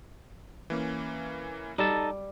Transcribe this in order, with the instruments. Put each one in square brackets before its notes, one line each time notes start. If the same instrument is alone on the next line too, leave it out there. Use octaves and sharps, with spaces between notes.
[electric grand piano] E3 A#3 C#4
[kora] G3 [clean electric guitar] D#4 A4 A5